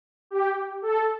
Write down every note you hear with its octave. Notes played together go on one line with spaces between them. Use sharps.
G4
A4